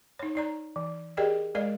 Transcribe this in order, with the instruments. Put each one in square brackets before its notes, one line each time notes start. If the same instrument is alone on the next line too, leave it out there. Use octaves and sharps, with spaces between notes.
[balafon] D#4 C#5
D#4 D5 A#5
E3
G4 G#4 A#4 D5 D#5 G5
G#3 A#4 D5 D#5 F5